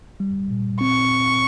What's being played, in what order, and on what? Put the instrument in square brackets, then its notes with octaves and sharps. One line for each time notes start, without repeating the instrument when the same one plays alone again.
[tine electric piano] G3
A#2
[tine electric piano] C4 [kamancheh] C#6